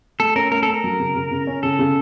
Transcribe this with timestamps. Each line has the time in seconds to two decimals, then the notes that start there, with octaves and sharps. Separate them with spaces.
0.20 A3 A4
0.36 C#4 A#4
0.52 A3 A#4
0.63 C#4 A4
0.74 A#4
0.84 F#3
0.99 C#3
1.15 C#3
1.31 C#3
1.47 C#4
1.63 C#3 A4
1.79 C#3